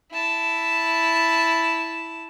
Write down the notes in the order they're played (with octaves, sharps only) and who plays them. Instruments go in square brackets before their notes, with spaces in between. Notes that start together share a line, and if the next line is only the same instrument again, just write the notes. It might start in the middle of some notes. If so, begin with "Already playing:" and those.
[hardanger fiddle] E4 A5